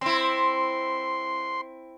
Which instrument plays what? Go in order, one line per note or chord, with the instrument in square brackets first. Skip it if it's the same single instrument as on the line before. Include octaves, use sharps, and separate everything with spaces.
[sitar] C4 E4 [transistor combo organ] C6